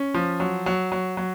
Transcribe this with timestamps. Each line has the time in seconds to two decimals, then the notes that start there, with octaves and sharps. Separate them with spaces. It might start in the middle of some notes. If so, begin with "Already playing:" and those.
Already playing: C#4
0.14 F3
0.40 F#3
0.66 F#3
0.92 F#3
1.17 F#3